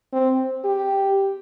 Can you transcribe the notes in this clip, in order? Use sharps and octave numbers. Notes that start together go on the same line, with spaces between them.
C4
G4